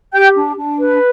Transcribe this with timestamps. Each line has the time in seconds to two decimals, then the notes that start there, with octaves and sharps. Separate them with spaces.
0.12 G4 G5 G6
0.34 D4
0.56 D4
0.78 B4